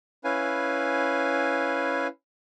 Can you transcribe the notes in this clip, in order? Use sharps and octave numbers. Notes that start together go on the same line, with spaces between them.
C#4 E4 B4 F5 G#5